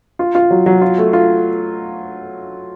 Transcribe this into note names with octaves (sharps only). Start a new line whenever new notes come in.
F4
F4
F#3
F#3
F4
A3
F4